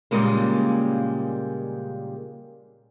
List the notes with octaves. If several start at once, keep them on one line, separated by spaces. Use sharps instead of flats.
A#2 C#3 G3 G#3 A#3